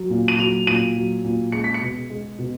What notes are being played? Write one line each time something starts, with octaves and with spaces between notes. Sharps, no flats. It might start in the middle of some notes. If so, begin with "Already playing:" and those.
Already playing: F#3
A#2
D#7
F#3 F7
A#2 D#7
F#3
A#2
G#3 C#7
B6
C#7
B2
G#3
B2